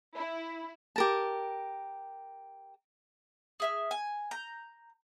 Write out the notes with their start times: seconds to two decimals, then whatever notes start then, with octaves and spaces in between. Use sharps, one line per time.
0.16 E4
0.96 G4 A#4 A5
3.60 G#4 E5 F6
3.91 G#5
4.31 A#5 G6